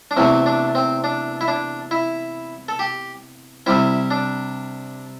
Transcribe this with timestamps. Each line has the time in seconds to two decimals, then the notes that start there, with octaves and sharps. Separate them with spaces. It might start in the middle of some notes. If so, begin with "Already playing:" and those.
0.11 D4
0.17 E2 C3 E3 A3 C4
0.46 D4
0.75 C4
1.04 D4
1.41 E4
1.48 D4
1.91 E4
2.68 A4
2.79 G4
3.66 C3 G3 C4 E4
4.11 D4